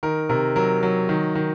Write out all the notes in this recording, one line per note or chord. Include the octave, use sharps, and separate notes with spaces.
D#3 A#4
C3 A#4
F#3 A#4
F#3
D#3
D#3